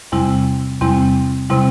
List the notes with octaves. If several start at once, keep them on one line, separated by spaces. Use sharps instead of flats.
E2 C3 G3 C4 E4
E2 C3 G3 C4 E4
C3 G3 C4 E4